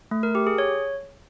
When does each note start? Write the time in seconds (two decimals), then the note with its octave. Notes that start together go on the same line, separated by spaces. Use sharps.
0.11 A3
0.23 A#4
0.35 G4
0.47 G#4
0.58 C#5